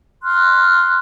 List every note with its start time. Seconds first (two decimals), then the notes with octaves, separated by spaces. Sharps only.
0.23 C6 F6 F#6